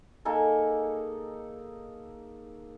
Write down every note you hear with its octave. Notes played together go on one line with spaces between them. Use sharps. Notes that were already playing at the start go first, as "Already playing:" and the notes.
A#3 D#4 G#4 A4